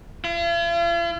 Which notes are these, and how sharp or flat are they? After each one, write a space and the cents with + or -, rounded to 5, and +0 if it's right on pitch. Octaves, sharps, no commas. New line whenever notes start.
F4 -45